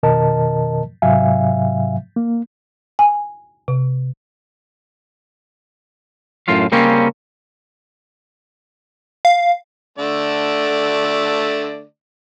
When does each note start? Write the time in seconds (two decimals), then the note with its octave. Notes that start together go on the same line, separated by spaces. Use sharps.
0.03 F2 B2 D#3 A#4 D#5 A5
1.02 G#2 C3 F#3 E5 F5 G#5
2.16 A#3
2.99 G#5
3.68 C3
6.48 F#2 A2 F4 F5
6.72 C#3 G3 A#3 C4 C#4
9.25 F5
9.98 D3 A3 D5